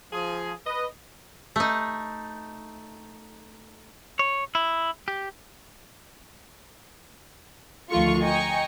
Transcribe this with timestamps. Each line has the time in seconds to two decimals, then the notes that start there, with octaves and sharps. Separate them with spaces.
0.13 F3 G#4
0.66 B4 D#5
1.56 A3 D#4
4.19 C#5
4.55 E4
5.08 G4
7.90 D2 D#3 F3 A3 F4 C#6
8.23 D#5 G5 G#5 A#5 C#6